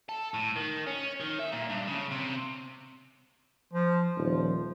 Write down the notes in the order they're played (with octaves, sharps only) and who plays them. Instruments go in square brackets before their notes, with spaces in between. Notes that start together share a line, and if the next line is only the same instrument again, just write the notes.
[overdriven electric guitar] A4
A2
D#3
C#4
D#3
E5
A#2
G2
C#3
C3
[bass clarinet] F3
[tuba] D#1 [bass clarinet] F3